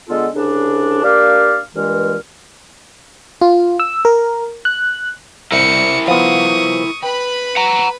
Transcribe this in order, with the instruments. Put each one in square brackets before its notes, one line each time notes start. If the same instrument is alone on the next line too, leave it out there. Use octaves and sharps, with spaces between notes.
[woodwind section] D3 G#3 B3 F4 A4
C2 C#3 D4
A#3 D4 G4 D5 F5
G2 A#2 E3 G#3 F6
[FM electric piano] F4
E6
A#4
F#6
[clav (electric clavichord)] C2 [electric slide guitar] E4 A#4 C5 [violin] C#7
[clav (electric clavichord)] F3 B3 [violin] C#6 D#6
[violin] B4 B5 [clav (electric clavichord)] G5
[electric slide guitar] F#5 A#5